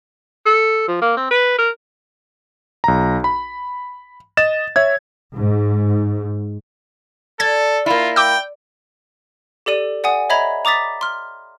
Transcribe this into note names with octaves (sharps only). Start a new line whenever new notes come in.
A4
F3
A#3
C4
B4
A#4
B1 A#5
B5
D#5 A6 E7
C#5 E5 G#6
G#2
A4 D5 G#6 A6
A#3 E4 F4
G5 D6 E6
G4 A4 D5 D#7
D5 F#5 G#5 D#6
C#5 D#5 E5 A#5 B5 G#6
A#5 D6 D#6 A6 B6
C6 F6